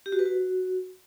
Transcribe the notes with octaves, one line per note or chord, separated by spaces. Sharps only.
G4
F#4
B4
F#4